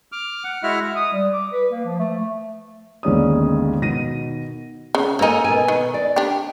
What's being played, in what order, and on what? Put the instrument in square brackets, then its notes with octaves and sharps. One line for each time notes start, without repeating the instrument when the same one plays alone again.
[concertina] D6 F6
F#5
G#3 E4 F#4 E5 F#5 F6
[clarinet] D#6
G3
D6
B4
A#3
F3
A3
[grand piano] G1 D#2 G#3 C#4 D5 D#6
B2 D#3 A#6 D#7
[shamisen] C#3
[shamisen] A#3 D#4 [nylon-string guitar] A4 A#4 G#5
[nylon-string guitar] B2 G#5
[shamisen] D#3
[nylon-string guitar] D5
[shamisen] D4 G4